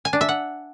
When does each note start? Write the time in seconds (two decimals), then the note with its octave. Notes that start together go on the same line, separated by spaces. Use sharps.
0.05 G#5
0.13 D4
0.21 E5
0.29 F#5